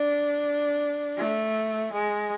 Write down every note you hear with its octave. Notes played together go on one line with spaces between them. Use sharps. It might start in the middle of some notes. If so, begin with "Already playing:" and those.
Already playing: D4
A3
G#3